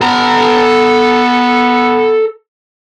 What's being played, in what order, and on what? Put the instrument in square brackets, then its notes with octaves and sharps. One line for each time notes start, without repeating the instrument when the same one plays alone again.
[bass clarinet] B3 [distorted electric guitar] A4 A#5